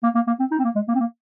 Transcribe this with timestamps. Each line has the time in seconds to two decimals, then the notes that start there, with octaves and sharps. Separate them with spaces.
0.03 A#3
0.15 A#3
0.27 A#3
0.40 C4
0.51 D#4
0.59 C4
0.64 A#3
0.75 G#3
0.88 A#3
0.95 C4
1.00 A#3